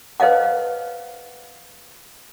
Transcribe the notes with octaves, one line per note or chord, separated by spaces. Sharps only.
B4 C5 D#5 F5 F#5